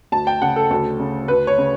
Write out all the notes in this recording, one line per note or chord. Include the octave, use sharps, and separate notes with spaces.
D2 A5
G5
C#3 F#5
A4
D2 A4
C#3
D2 B4
C#5
C#3